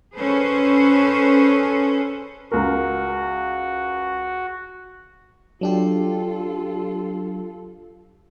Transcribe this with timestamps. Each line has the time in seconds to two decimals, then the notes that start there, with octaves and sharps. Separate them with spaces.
0.18 C#4 G#4 A4 B4 C5
2.52 C#2 F#4 A#4
5.61 F#3 D4 F4 G4 A4